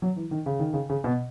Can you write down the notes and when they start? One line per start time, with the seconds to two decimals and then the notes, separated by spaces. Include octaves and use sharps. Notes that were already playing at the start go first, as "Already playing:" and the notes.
0.02 F#3
0.16 E3
0.31 D#3
0.46 C#3
0.59 D#3
0.73 C#3
0.90 C#3
1.04 B2